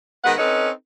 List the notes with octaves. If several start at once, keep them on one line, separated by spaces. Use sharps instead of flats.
D#3 G#3 B3 F#5
C4 C#4 D#4 A4 B4